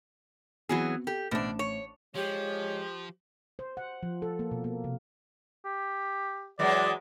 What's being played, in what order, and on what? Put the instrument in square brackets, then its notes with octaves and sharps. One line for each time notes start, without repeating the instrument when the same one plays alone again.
[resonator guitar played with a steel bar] E3 F#3 G#4 [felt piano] B3 C4 F#4
[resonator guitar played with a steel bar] G4 [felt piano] A4
[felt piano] A1 C5 E5 [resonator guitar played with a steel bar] B2 D4
[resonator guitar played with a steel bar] C#5
[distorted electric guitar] F3 [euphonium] G#3 [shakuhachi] G4 [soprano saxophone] C#5
[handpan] C5
F#5
F3
A4
A#3
B2
A#3
C3
[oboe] G4
[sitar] E3 F#3 G#3 [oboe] D5